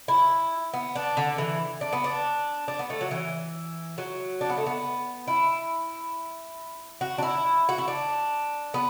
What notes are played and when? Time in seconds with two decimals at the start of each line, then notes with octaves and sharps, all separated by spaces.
0.08 E4
0.73 B3
0.95 D4
1.17 D3
1.38 E3
1.81 D4
1.93 B3
2.04 D4
2.68 D4
2.79 B3
2.90 A3
3.01 F#3
3.11 E3
3.98 F#3
4.41 D4
4.50 B3
4.57 A3
4.66 B3
5.28 E4
7.01 F#4
7.18 D4
7.23 E4
7.69 F#4
7.78 E4
7.88 D4
8.74 B3